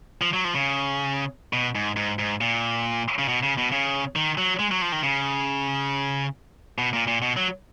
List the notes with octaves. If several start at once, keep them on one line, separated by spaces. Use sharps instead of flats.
F3
F#3
F3
C#3
B2
G#2
G#2
G#2
A#2
C#3
B2
C#3
B2
C#3
D#3
F#3
G#3
F#3
F3
D#3
C#3
B2
A#2
A#2
B2
F#3